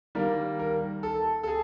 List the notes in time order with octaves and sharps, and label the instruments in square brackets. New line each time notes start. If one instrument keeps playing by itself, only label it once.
[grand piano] D#3 G3 A#3 A#4
A#4
A4
A4
G#4